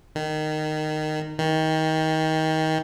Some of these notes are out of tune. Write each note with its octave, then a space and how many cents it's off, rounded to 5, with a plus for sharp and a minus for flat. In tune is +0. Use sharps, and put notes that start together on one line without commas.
D#3 -15
D#3 +25